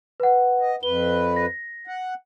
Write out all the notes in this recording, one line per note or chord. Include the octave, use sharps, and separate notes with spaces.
B4 F#5
D#5
F2 B4 G7
A#6
F#5